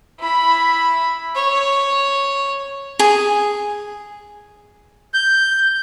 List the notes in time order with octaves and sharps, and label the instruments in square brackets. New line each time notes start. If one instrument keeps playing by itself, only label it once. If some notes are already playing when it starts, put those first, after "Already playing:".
[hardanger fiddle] E4 B5
C#5
[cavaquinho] G#4
[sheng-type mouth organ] G6